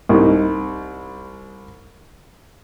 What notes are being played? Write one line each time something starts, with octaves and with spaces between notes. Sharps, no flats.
C2 D#4